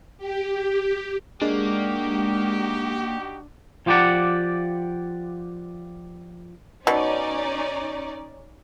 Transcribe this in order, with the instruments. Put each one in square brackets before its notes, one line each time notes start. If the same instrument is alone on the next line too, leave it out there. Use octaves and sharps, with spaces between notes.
[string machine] G4
[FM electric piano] G#3 [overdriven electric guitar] A#3 [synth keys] D4 [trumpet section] D#4 F#4 G4
[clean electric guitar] F3 F4 G4 B4 D5 F#5
[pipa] B2 [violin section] C#4 D#4 D5